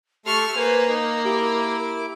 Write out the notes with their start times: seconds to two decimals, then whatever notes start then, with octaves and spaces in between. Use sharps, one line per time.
0.26 A3 G4 A4 C6 C#6 F6
0.56 A#3 B4 C5 G#5
0.88 D#4 A#4
1.25 E4 G4 D6